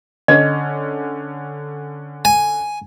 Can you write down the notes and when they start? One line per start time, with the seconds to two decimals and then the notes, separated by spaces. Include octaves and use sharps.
0.28 D3 C#4 D#5
2.25 G#5